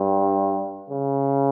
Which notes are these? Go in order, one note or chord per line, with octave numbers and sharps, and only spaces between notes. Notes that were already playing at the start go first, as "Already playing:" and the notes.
Already playing: G2
C#3